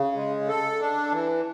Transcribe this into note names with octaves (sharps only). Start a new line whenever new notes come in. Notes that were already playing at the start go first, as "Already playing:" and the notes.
Already playing: C#3
G#3
A4
D4
E3